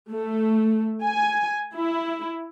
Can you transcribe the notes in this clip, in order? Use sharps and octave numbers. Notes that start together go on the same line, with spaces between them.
A3
G#5
E4